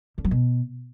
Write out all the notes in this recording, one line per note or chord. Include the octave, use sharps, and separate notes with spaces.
D3
F#3
B2